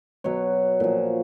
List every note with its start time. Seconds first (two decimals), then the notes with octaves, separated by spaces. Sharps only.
0.24 B2 F#3 C#5
0.80 A#2 F3